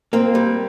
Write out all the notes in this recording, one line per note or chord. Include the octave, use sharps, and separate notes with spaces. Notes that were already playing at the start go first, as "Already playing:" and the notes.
A#3 C4
G3